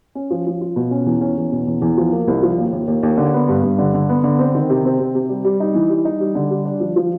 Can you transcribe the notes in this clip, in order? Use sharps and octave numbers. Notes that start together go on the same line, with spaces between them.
C#4
F3
F3
F4
B2
C#4
E2
C#4
E2
B2
E2
E2
F3
A#3
C2
F3
D#2
D#2
D#2
D#2
D3
B3
G2
G2
D3
D3
B3
D3
C4
D#3
C3
C4
C3
C3
G3
G3
D#4
E3
G3
D#4
G3
D3
G3
D4
F3
F3